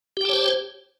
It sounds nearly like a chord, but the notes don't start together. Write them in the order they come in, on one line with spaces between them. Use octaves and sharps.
G4 G5 A5 C#5 C5